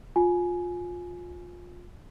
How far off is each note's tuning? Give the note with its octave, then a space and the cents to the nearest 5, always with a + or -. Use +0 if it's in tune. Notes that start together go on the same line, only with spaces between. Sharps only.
F4 +20 G#5 +15